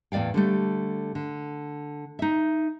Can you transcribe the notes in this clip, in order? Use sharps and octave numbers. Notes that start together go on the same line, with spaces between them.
E2 A2 D5 F5 G5
D3 G3 A3
D3
D#4 E5